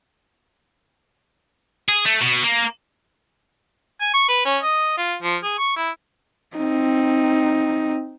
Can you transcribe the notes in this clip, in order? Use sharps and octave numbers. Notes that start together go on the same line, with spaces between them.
G#4
A3
B2
A#3
G#5
C#6
B4
C#4
D#5
F4
F3
G#4
C#6
E4
C4 D#4